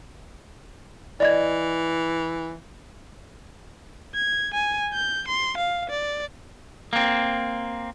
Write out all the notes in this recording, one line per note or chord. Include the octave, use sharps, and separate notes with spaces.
E3 D5 D#5 G#6
G#6
G#5
G6
C6
F5
D5
A#3 C4